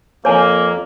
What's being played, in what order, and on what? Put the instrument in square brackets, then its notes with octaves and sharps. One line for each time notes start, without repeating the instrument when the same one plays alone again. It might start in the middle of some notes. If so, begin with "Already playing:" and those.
[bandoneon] F2 [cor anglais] A#3 [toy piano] C#5 G#5